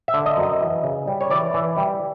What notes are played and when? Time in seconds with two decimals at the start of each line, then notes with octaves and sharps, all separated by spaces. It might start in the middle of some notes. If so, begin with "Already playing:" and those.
0.08 E5
0.14 D3
0.26 D#5
0.37 F#2
0.43 D#5
0.61 E3
0.84 C#3
1.07 G3
1.21 C#5
1.30 E3 D5
1.54 E3
1.77 G3